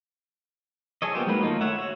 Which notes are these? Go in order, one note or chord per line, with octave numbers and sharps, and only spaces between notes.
G#4 A4 C#5 D#5
A#3 B3 F4 G4 C5
F#3 G#3 A#3 D#4 B4
D#3 A3 A#3 D#4 F4
C#5 E5 F#5
F#4 C#5